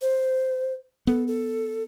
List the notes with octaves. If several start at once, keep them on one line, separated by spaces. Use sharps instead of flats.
C5
B3 A4
A4